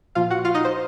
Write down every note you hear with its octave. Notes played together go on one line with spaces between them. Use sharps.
A#2 F3 F4 F5
F#4 F#5
F4 F5
D#4 D#5
C5